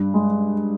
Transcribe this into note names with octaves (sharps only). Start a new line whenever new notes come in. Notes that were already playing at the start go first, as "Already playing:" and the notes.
Already playing: G2
G#3